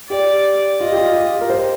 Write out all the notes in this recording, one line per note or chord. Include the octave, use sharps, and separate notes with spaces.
G4 D5
F4 D#5
G4
F4
G4
A#4
C5